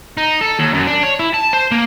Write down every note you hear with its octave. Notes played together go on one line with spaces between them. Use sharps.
D#4
A4
D#2
F#2
D4
C#5
E4
A5
C5
A#3